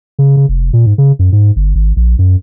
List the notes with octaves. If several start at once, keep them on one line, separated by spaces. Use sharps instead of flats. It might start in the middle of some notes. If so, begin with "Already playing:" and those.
C#3
C#3
F1
A#2
G#2
C#3
F#2
G#2
G1
G#1
A#1
F#2